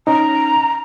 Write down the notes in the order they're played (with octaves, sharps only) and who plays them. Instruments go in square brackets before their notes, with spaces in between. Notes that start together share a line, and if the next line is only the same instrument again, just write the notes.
[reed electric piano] C#4 D#4 [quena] A#5